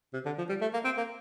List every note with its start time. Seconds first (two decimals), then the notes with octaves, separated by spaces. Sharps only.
0.14 C3
0.26 D3
0.38 F3
0.49 G3
0.62 A3
0.74 A#3
0.85 C4
0.97 A#3